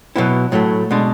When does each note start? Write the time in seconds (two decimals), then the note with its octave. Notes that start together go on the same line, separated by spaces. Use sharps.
0.16 B2 F#3 B3 E4
0.52 A2 F#3 A3
0.91 B2 G#3 D4